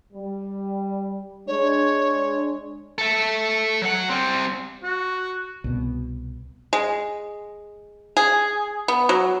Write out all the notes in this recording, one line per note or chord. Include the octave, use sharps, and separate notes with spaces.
G3
G#3 D4 C#5
A4 E5
F#3 F#5
G3 C4
F#4
C2 B2
G#3
G#4
B3
F#3